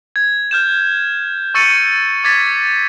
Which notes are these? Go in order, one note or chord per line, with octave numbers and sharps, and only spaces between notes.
G#6
F6 G6 E7
C#6 E6 A6 C#7 D#7
D6 G#6 A6 B6